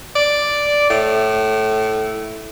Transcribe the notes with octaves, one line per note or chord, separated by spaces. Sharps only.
D5
A2